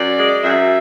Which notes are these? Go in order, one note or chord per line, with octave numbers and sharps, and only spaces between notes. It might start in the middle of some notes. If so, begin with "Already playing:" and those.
Already playing: F#2 D5
G#3
F#2 E5